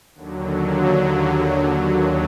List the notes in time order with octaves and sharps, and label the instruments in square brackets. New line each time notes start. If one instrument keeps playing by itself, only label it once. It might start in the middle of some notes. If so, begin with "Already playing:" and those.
[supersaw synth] D#2 D3 F#3